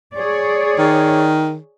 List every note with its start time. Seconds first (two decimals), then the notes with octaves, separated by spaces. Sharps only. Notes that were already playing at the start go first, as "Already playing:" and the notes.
0.15 G#4 C#5 D5
0.79 D#3